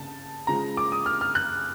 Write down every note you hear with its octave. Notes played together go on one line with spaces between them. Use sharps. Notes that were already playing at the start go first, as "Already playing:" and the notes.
Already playing: C#3 A5
C#3 F3 G#3 A#5
D6
D#6
F6
F6
F#6